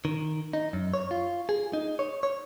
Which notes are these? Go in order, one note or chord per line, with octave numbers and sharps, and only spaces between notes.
D#3
D#4
F#2
C#5
F4
G#4
D#4
C#5
C#5